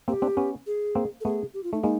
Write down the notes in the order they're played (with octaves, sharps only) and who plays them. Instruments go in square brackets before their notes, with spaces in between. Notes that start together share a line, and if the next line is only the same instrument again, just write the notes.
[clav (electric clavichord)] A#3 C4 [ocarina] G4
[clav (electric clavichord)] C4 D4
B3 C#4
[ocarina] G#4
[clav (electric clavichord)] A#3 C4
[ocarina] A4
[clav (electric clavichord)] A3 B3 [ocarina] G#4
[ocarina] G4
F4
[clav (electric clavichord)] A3 [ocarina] D#4
[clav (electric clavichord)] G#3 A#3 [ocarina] D#4